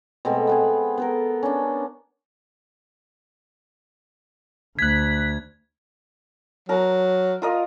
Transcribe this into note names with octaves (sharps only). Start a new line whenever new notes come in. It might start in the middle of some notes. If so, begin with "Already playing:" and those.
B2 G#3 A3 C4
B3 C4 G#4
B3 A4 A#4
C#4 D4
D2 F#6 G#6 B6
F#3 A#4 A#5
F4 A#4 D#5